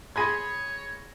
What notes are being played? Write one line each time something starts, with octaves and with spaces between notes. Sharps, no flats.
G#4 C#5 B5 C6 G#6 A#6 D#7